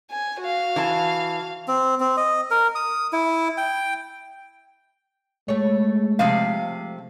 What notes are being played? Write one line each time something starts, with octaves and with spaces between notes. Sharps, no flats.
G#5
F#4 F5
E3 G#5 A5
C4
C4
D#5
A#4
D#6
E4
G5
G#3 A3 C#5
C3 F3 F5